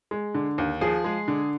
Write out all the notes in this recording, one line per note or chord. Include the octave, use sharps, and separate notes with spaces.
G#3
D3
D#2
F3 G#4
G#3
D3